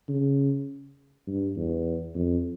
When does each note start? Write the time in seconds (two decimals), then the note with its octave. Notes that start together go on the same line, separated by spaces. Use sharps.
0.09 C#3
1.27 G2
1.57 E2
2.15 F2